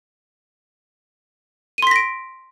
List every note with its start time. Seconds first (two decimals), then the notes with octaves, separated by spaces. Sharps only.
1.78 D#7
1.82 C6
1.87 B6
1.91 A#6
1.96 D7